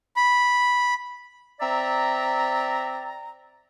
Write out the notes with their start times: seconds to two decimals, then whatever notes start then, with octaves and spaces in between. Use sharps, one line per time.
0.16 B5
1.60 C4 D5 E5 A#5